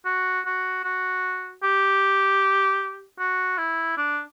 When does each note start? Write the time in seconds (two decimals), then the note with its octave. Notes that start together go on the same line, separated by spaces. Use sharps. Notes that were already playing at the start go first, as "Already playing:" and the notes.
0.06 F#4
0.46 F#4
0.84 F#4
1.63 G4
3.19 F#4
3.58 E4
3.97 D4